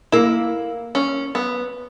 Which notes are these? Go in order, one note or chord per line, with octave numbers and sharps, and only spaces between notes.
A#3 E4
C#4
B3